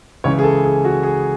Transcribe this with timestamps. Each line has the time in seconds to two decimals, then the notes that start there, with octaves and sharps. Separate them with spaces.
0.24 C#2 C#3 E3 C#5
0.39 G#4
0.43 A4
0.64 G#4
0.84 F#4
1.03 G#4